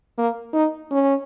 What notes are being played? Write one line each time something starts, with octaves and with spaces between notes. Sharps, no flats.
A#3
D#4
C#4